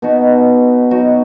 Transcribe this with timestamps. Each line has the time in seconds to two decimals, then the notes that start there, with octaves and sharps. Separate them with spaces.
0.02 B2 B3 D#4 F#4
0.91 B2 F#3 D#4 F#4